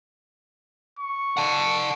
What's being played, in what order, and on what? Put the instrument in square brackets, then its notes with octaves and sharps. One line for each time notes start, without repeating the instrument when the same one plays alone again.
[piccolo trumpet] C#6
[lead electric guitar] F#5 A5